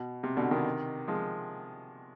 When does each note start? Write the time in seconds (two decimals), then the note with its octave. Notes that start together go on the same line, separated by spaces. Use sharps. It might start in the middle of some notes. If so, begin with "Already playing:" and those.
Already playing: B2
0.23 C3
0.37 B2 D3
0.51 C3 D#3
1.08 F3 G#3